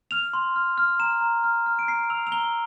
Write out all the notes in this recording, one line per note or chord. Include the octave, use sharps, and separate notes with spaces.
F6 F7
C6
F6
F6
A#5 E7
A#5
F6
F6
D7
A#5 C7
E6 F7
F7
A#5 G7